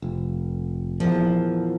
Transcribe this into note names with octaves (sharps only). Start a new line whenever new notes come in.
F1
E2 A#2 F3